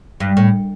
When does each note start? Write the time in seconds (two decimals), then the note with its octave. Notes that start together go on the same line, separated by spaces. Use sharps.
0.20 G2
0.37 A2